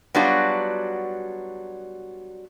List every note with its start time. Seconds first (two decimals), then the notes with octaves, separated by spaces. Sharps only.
0.15 F#3 G3 B3 D4 F4 F#4